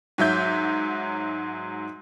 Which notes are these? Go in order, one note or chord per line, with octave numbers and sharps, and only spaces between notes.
G#2 F#3 E5 G6